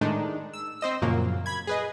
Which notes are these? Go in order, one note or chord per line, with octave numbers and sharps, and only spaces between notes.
A2 D#3 G#3 D4 D#4
E6
C4 C5 D#5 E6
F#2 A#2 C#3 F3 F#3 A#3
B5 G#6
G#4 B4 D#5